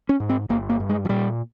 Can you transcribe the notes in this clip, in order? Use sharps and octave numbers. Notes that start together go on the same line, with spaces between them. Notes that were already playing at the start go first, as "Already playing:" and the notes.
C#4
G#2
C4
G1 A#3
A#3
G2
G#3
F3
A#2 G3